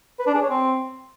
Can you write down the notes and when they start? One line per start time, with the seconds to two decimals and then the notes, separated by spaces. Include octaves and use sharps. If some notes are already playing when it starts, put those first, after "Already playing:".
0.19 B4
0.27 D4
0.35 G#4
0.42 C#5
0.50 C4